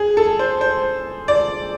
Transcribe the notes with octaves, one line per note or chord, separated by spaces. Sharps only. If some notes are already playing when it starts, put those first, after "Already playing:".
Already playing: G#4
A4
C5
C5
D5